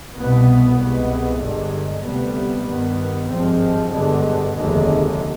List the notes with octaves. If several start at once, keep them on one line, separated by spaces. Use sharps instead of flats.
C2 B2 B3
C2 B2 G#3 B3
G1 G2 D3 G#3
D2 C3 G3 B3
G2 D#3 B3
G#1 G2 F3 G#3 C4
G2 D3 G#3 B3
F1 D#2 D3 G#3